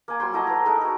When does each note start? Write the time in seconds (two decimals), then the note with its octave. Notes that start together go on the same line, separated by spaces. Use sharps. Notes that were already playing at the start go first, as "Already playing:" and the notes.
0.08 A#3 G#5
0.20 F#3 G3 G5 C6
0.33 A3 E4 D#5 A5
0.47 B4 A#5
0.66 G#3 D#4 A4 A#4
0.81 F#4 A#4